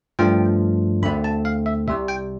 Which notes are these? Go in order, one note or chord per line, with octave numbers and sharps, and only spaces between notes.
G2 F3 A3 D4 G5
D2 D3 A3 C4 B5
A5
F5
E5
C2 C3 G3 E5
G5